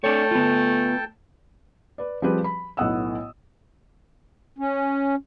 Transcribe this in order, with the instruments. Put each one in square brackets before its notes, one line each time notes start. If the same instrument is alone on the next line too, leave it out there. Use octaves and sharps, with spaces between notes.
[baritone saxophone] A3 [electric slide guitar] D4 C#5 [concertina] A4 G5 A5
[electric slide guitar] B3 F4
[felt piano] B4 D5
F3 G3 C4 G4 G#4 B4
B5
B1 A2 B3 F#5 D#6 E6
[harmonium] C#4